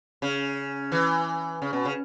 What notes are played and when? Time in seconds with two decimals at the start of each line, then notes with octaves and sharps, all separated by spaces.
0.22 C#3
0.92 E3
1.62 C#3
1.73 B2
1.85 C#3